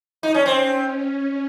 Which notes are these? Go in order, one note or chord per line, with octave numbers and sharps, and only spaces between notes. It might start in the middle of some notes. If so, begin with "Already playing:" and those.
D#4
C#4
C4 C#4